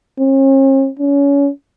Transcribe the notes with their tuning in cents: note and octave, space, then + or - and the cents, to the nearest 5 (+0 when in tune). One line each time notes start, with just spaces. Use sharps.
C#4 -45
C#4 +25